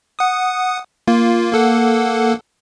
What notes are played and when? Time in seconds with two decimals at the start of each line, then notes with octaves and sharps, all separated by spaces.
0.19 F#5 D#6
1.07 A#3 F4
1.53 A#3 A4 F#5